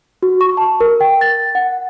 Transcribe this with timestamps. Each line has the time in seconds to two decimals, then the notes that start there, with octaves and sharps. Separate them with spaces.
0.23 F#4
0.41 C#6
0.57 A5
0.81 A#4
1.01 G5
1.21 A6
1.55 F#5